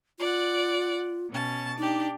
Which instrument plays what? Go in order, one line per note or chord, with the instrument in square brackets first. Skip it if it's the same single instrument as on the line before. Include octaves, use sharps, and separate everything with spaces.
[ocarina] F4 [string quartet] D5 F#5
[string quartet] B2 C#4 A5
[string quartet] D4 G4 [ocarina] D#4